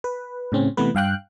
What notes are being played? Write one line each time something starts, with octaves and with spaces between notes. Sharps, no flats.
B4
A2 C#3 C4 C#4
C3 E3 A3 B3 B4
G2 F5 G5 F#6